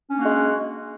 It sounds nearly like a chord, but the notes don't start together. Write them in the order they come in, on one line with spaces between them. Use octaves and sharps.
C#4 D4 A#3 F#4 G#3